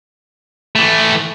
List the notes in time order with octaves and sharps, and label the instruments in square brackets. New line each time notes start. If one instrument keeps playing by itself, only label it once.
[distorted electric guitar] E3 A3